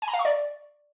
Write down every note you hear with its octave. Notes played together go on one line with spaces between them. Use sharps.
G#5
A#5
F5
C#6
D5